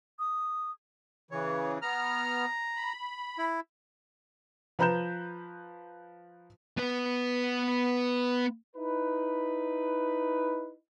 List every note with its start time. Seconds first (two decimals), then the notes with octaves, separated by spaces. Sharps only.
0.19 D#6
1.31 C#3 E3 C#5
1.82 B3 A#5 F6
2.76 B5
3.38 E4
4.79 F3 B4 A#5 B5 G6 E7
6.78 B3 B4
8.76 D#4 E4 B4